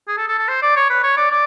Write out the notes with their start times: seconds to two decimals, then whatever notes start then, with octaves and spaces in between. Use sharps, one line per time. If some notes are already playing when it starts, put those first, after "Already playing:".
0.08 G#4
0.17 A4
0.28 A4
0.39 A4
0.48 C5
0.63 D5
0.76 C#5
0.90 B4
1.03 C#5
1.17 D5
1.31 D5